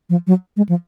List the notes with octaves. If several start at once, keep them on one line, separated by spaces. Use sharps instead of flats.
F3
F#3
G#3
F3